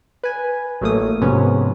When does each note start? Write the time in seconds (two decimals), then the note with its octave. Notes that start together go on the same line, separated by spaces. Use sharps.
0.23 B4 G#5
0.81 A1 F#3 A3 A#3 D#6
1.22 G#2 C3 F3 B3 C#4